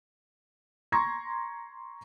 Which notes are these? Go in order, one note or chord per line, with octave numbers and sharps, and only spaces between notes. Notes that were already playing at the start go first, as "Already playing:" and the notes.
A#5 C6 C#6 G#6 A#6